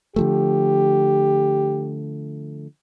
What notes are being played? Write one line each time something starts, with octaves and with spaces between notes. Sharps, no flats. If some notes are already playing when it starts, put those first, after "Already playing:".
D3 F3 A3 G4